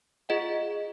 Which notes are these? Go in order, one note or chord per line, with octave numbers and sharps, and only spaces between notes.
F4 G#4 D#5 F#5